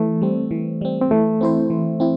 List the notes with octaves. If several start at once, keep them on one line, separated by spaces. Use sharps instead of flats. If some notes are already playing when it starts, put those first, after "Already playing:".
Already playing: E3 A3
G3 C4
E3
G3 C4
C4
E3 A3
C4 E4 C5
E3
C4 E4